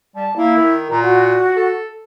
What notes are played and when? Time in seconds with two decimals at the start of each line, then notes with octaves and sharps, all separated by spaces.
0.15 G3 A5
0.36 A#3 E4
0.56 D#3
0.90 A#2 A#5
1.02 F#4
1.56 A4